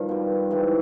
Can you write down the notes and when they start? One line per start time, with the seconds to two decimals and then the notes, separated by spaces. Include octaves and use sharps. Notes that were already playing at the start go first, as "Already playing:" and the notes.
Already playing: G2 D#3 F3 F4
0.09 B2 G3
0.50 G#2 D#3 E3 G3 D#4